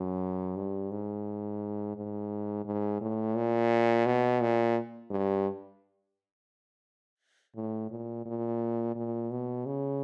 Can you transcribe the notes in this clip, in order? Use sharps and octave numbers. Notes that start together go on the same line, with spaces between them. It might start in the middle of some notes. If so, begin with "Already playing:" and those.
Already playing: F#2
G2
G#2
G#2
G#2
A2
A#2
B2
A#2
G2
A2
A#2
A#2
A#2
B2
C#3